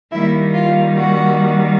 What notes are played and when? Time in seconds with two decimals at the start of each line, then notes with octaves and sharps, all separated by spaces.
0.12 D#3 G3 A#3 E4 E5
0.53 F4 F5
0.95 F#4 F#5